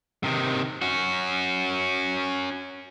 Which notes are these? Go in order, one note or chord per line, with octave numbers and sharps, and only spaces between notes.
C3 D#3
C#4 F#4